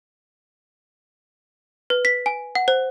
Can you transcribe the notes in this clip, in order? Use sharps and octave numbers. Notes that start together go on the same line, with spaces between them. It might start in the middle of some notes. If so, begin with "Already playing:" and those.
B4
B6
G#5
F#5
C5